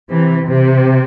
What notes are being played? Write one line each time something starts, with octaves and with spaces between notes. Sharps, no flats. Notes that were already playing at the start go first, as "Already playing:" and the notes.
C3 E3
C3